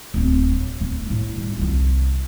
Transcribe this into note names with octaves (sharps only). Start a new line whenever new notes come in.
D1 C4
F#3
D1
A2
G2
C2 F4